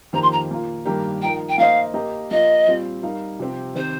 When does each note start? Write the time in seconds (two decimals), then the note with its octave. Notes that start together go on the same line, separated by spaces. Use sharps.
0.13 F2 D#3 A#3 G4 C5 A#5
0.22 C6
0.32 A#5
0.49 A#2 A#3 F4
0.86 G2 D#3 A#3 G4 A#4
1.22 F3 D#4 A#4 G5
1.48 G5
1.58 A#3 D#4 C5 D#5 F5
1.94 A#3 G4 A#4 D#5
2.30 F3 A#3 F4 D#5
2.67 A#2 G3 C4 F4
3.03 G3 D#4 A#4 F5
3.39 C3 F3 C4 G4
3.75 D#3 C4 G4 C5